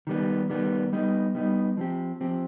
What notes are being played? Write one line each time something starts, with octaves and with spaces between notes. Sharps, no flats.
D#3 G3 B3
D#3 G3 B3
G3 B3 D#4
G3 B3 D#4
F3 C4 G4
F3 C4 G4